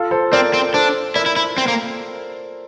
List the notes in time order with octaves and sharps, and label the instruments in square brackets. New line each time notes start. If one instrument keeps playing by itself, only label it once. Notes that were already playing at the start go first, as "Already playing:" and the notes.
Already playing: [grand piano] F4 A4
A4 C5
[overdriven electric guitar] C4 [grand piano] A#4 D5
[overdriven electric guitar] C4
[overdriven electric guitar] D4 [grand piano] A4 C5
[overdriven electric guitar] E4 [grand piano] A#4 D5
[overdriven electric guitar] E4
E4
C4
A#3